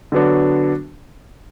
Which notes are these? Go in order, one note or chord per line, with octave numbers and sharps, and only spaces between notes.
D3 F#3 B3 D4 F#4